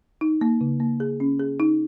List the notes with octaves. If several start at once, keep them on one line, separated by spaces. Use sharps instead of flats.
D#4
A#3
C#3
A#3
G#4
C#4
G#4
D#4